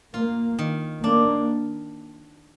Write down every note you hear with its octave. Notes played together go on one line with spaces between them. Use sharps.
A#3 F4
D#3
A#3 D4